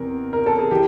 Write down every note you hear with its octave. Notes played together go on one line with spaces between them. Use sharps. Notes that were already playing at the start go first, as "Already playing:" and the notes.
Already playing: E2 C3 A#4
A#4
A4
G#4
E3 G4